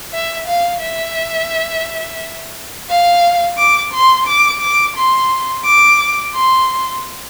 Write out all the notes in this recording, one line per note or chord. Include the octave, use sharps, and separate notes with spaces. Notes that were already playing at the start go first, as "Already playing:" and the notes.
E5
F5
E5
F5
D6
C6
D6
D6
C6
D6
C6